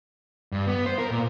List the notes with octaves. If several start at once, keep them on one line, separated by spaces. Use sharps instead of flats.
G2
B3
C5
A#4
A#2